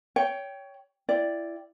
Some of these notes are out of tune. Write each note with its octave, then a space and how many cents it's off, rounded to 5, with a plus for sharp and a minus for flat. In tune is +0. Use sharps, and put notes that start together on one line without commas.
C#5 +20 G5 +0
E4 +25 D5 +0 G5 +0